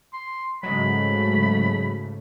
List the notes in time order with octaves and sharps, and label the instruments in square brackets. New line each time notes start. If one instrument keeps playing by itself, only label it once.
[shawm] C6
[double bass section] G#2 C#3 A3 [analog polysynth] F#3 G#3 [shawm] B5